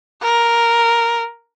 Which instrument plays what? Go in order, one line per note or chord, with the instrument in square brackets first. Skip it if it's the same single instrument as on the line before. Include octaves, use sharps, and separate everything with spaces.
[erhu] A#4